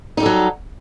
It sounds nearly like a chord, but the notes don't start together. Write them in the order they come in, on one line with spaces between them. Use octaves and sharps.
D#4 G3 A4 F#3